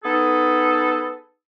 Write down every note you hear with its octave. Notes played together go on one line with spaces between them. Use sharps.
B3 D#4 G#4 A4